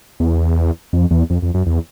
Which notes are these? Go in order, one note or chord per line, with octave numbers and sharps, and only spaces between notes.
E2
F2
E2
F2
F2
F#2
E2